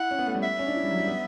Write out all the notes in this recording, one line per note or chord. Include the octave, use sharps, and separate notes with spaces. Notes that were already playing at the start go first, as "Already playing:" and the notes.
Already playing: E4 F#5
C#4
B3
A3
G3
E5
C#4
D4
E4
G3
F#3
G3
B3